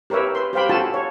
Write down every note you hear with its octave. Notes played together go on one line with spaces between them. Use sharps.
G4 A#4 B4 C#5 E5
B4 C6
G4 C5 F5 G5 B5
F4 F#4 A4 G#5 A5
C#5